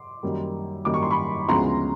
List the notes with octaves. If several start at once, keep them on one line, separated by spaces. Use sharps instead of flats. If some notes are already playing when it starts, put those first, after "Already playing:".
Already playing: C6 D6
F#2 D#3 G3 A#3
F#2 D#3 G3 A#3 D6
C#6
C6
B5 C#6
D2 C#3 F3 G#3 B3 A#5 C6